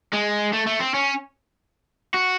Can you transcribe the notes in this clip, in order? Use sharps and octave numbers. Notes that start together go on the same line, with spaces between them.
G#3
A3
A3
C4
C#4
F#4